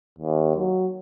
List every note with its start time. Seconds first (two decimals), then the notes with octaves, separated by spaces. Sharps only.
0.19 D#2
0.56 F#3